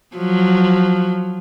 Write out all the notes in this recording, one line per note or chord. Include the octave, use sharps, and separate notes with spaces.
F3 F#3